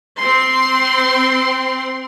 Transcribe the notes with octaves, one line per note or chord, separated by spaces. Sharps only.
C4 C6